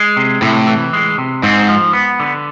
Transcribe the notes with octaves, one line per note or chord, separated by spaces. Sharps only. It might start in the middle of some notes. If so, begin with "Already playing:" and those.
Already playing: G#3
C3
A2 C3
E3
G#3
C3
G#2 C4
F3
B3
D3